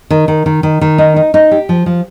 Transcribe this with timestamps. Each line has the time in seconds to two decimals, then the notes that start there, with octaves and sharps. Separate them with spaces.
0.10 D#3
0.28 D#3
0.46 D#3
0.63 D#3
0.81 D#3
0.98 D#4
1.16 D#4
1.34 D#4
1.51 G4
1.69 F3
1.86 F3